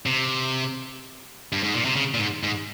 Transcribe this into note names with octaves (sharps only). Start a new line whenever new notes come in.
C3
G2
G#2
A#2
C3
C#3
A#2
G#2
G#2